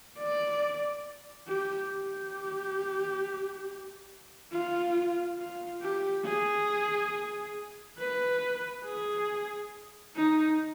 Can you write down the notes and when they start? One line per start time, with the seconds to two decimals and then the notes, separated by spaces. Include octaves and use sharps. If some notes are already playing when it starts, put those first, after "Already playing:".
0.18 D5
1.48 G4
1.91 G4
4.52 F4
5.38 F4
5.81 G4
6.25 G#4
7.99 B4
8.86 G#4
10.15 D#4